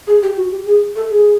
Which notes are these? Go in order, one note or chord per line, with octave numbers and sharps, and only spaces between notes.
G#4
G4
F#4
G4
G#4
A4
G#4